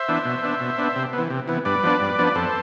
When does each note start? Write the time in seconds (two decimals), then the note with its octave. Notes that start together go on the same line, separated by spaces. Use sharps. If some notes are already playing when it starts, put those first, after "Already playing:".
Already playing: C5 E5
0.08 E3 B3 D4
0.25 B2
0.43 B3 D4
0.60 B2
0.78 B3 D4
0.96 C3
1.13 B3
1.18 E3
1.30 C3
1.48 E3 B3
1.65 G2 B4 D5
1.83 F3 B3 D4
2.01 G2
2.18 F3 B3 D4
2.27 D5
2.35 F2 A4 C5